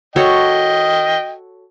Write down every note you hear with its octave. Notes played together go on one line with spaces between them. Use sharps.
F#4 A4 C#5 D#5 G5